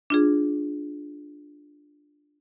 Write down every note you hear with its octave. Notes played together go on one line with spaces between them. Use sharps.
D4 F4 G#4